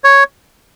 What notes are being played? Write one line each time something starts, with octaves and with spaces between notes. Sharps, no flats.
C#5